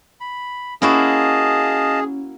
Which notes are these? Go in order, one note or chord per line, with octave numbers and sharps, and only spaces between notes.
B5
A#3 C#4 E4 F#4 G#4 D#5 F5 A5